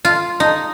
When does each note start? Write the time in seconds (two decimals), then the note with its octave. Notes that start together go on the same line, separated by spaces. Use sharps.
0.05 F4
0.40 D#4